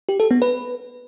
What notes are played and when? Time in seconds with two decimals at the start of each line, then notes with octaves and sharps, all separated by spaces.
0.09 G4
0.20 A4
0.31 B3
0.42 B4